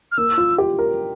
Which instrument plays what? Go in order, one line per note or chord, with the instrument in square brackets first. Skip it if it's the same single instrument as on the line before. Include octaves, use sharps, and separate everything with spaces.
[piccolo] F6
[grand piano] A#3 [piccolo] E6
[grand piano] F4
G4
A#4